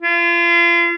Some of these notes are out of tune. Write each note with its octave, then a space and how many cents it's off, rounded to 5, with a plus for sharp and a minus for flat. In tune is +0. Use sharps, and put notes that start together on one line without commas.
F4 -35